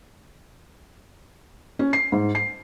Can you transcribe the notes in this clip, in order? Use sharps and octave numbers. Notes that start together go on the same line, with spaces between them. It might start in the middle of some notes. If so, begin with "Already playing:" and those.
C#4
C7
G#2
C7